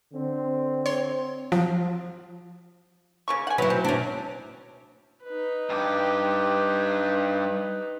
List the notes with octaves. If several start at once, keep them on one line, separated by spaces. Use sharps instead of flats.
D3 C4
C#5 C6
F3
C#3 A#3 C#6
F#5 G#5
F#3 E4 B4
C4
C#4 D4
D#4 B4
G2 G4